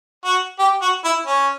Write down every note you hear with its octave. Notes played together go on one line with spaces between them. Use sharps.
F#4
G4
F#4
E4
C#4